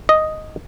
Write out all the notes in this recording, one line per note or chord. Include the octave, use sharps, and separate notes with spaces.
D#5